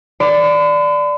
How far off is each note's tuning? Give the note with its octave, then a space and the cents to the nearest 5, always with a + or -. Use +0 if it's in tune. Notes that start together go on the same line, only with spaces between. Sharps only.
D5 +0 B5 +45